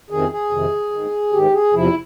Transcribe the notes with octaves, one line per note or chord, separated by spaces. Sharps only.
F2 C3 D#3 G#4
G#4
F2 C3 D#3
G#2 D#3
G#2 D#3 G4
G#4
E2 C3 F3 E4